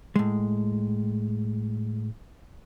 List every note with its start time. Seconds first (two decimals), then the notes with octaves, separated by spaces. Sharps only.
0.16 A2 G#3